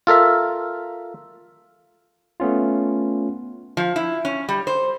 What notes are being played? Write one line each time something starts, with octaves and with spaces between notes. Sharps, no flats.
F4 A4 A#4 E5
A3 B3 C#4 F4
F3
E4
C#4
G3
C5